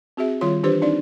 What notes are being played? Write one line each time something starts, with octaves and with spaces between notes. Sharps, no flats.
C4 F#4 G#4 E5
D#3 G3 F4 C#5 C6
E3 D4 G4 B4 C5
C4 D4 D#4 D5